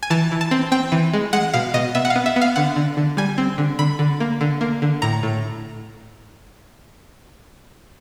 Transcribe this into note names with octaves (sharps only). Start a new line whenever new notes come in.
G#5
E3 A5
E3
A5
C4
C4 G5
E3
G#3
G#3 F#5
B2 F5
B2 D#5
B3 E5
F#5
F5
B3
E5
B3
F5
D3 F#5
D3
D3
G3 G#5
C4
D3
D3 B5
D3
A#3
D3
A#3
D3
A2 A#5
A2